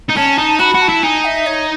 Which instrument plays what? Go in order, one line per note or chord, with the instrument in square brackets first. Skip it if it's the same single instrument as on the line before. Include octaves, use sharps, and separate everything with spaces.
[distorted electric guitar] D#4
[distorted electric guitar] C#4 [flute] A5
[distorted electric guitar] D#4
[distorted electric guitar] F#4 [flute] B5
[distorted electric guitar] F#4
[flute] A5
[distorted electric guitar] E4
[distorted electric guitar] D#4 [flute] G#5
[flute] E5
C#5